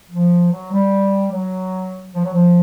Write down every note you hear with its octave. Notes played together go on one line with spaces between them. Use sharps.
F3
F#3
G3
F#3
F3
F#3
F3